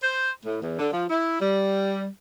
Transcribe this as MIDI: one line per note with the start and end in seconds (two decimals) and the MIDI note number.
0.03 0.31 72
0.44 0.59 45
0.62 0.76 40
0.78 0.87 50
0.92 1.04 53
1.09 1.38 64
1.41 2.06 55